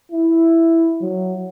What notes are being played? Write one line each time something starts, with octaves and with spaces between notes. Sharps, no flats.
E4
F#3